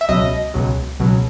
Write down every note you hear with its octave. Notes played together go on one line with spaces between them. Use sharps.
E5
C#2 B2 F#3 D#5
C#2 B2 F#3
C#2 B2 F#3